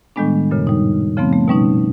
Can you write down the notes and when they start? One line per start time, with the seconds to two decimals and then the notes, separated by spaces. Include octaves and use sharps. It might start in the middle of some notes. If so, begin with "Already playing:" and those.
0.16 A2 D#3 G3 G#3 B3 D4
0.51 F#2 A#2 C#3
0.67 G3 D#4
1.17 C#3 F3 A3 B3 C4
1.33 A3
1.48 B2 G3 C#4 D#4